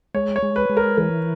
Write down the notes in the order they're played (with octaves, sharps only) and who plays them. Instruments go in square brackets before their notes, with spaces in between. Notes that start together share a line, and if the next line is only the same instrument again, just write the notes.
[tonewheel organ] G#3 [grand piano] C#5
[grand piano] C#5
[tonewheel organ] G#3
[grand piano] B4
[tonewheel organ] G#3
[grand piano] A#4
[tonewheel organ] E3 [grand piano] A#4